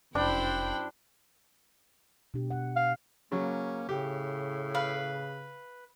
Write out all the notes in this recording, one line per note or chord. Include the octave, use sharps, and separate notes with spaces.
F1 F#2 D4 E4 C5 G5 B5
B2 D4 G4
F#5
F5
C#3 F#3 A#3 C#4
A2 C#3 G4
B4 F5